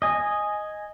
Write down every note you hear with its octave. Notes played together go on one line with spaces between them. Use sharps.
D#5 G#5